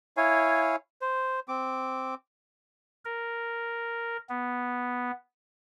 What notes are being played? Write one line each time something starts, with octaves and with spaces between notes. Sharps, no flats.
E4 C#5 F5 G#5
C5
C4 D6
A#4
B3